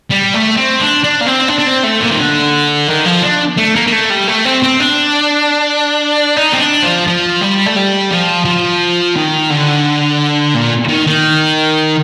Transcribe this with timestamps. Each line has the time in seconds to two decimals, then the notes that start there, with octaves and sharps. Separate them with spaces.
0.10 G3
0.34 A3
0.57 C4
0.80 D4
1.03 D4
1.21 A#3
1.26 C4
1.49 D4
1.59 D4
1.67 C4
1.84 A3
2.01 A#2
2.12 D#3
2.19 D3
2.88 D#3
3.06 F3
3.23 D4
3.58 A3
3.76 A#3
3.87 A#3
3.92 A3
4.10 G3
4.28 A3
4.45 C4
4.63 C4
4.80 D4
6.37 D#4
6.53 C4
6.60 D4
6.83 F3
7.07 F3
7.41 G3
7.66 A3
7.76 G3
8.11 F3
8.45 F3
9.16 D#3
9.50 D3
10.54 A#2
10.89 D#3
11.07 D#3